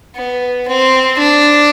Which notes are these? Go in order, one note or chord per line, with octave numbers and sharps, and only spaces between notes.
B3
C4
D4